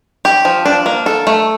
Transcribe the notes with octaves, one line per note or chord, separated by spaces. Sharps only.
G4
F3
D4
A#3
A4
A3